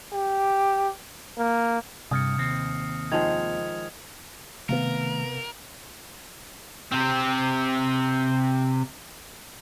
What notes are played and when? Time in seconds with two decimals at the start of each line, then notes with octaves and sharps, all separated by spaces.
0.12 G4
1.38 A#3
2.11 G2 C3 D#6 F6 C#7
2.38 D#2 C4
3.12 D#3 F3 G#3 G#6 F7
4.69 C3 D#3 A3 B3 A#4 F5
6.92 C3 C4